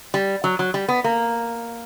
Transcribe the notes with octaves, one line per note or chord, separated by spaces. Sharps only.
G3
F#3
F#3
G3
B3
A#3